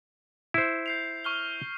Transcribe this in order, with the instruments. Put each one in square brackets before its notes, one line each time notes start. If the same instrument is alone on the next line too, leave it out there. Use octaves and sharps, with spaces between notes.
[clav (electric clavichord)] E4 C5
[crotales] G6 C7 F7
C#6 F6 G7